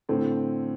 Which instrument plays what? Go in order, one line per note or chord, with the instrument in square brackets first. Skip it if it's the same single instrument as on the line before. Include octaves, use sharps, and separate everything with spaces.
[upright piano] A2 [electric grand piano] D3 C4 A4 C5